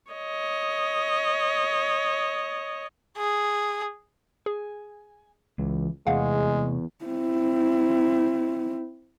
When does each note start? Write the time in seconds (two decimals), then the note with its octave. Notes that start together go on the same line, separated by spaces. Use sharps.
0.11 C#5 D#5
3.18 G#4
4.46 G#4 G#5
5.58 C#2 E3
6.07 E2 C3 G#3 A3 F5 F#5
7.05 C4 E4